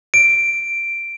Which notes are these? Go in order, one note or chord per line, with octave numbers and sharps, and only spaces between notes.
D7